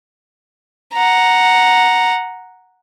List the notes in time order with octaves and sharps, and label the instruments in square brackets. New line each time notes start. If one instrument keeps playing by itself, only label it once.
[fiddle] F#5 A#5